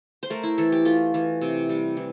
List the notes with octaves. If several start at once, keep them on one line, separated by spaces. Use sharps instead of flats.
C5
A3 A#4
E4
E3 A4
G4
A3 F4
E3
C3
G3
E3